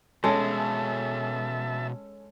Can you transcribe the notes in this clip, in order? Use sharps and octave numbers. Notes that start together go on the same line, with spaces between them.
B2 G#3 C#4 G#4 A4 E5 A5